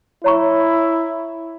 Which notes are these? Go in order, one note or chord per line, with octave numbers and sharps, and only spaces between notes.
E4 C#5 A#5 C#6